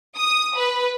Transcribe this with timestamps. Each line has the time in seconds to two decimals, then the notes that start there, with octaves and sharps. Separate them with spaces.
0.17 D#6
0.56 B4